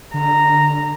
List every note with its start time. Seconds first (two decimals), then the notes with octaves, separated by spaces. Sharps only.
0.14 D3 A#5